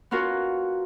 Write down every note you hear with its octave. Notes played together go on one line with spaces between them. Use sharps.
B3 C#4 F4 F#4 A#4